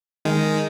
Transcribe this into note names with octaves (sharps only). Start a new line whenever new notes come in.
D#3 G#3